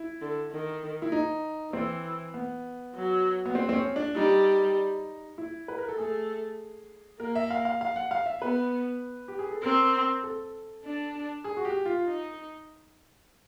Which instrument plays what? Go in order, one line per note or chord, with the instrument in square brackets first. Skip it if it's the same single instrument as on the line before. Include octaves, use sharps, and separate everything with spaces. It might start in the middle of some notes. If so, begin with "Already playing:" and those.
Already playing: [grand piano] E4
[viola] D3
D#3
[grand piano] E4
D#4
[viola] E3 [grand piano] C4
[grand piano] B3
[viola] F#3
[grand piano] B3
C4
C4
C#4
D4
[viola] G3 [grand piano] D#4
[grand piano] E4
B4
A#4
A4
[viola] A3 [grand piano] G#4
[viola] A#3 [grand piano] A#4
[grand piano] E5
F5
F5
F5
F#5
F5
E5
[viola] B3 [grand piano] B4
[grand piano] G4
G#4
A4
[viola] C4 [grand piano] A#4
[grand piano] A4
[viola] D4
[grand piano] G#4
F#4
G4
F4
[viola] D#4